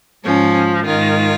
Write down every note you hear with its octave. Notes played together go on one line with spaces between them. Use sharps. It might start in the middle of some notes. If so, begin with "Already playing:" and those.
G#2 F3 C#4
G#2 D#3 F4